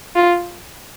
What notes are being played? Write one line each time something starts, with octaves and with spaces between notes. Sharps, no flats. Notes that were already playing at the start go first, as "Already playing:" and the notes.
F4